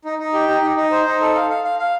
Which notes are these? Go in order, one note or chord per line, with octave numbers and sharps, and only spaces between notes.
D#4
D#4
G4
D#4
D#4
D#4
C5
D#4
A4
F5
F5
F5
F5